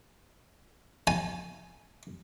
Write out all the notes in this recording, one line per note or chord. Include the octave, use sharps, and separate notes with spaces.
G#5